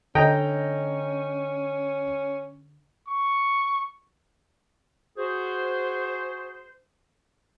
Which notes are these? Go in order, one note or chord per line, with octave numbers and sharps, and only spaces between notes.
D3 C#4 A4 D#5 G5 A#5
C#6
F#4 G#4 C5